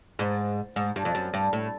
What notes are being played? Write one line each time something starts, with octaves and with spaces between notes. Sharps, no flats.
G#2
G#2
G2
F2
F#2
G2
A2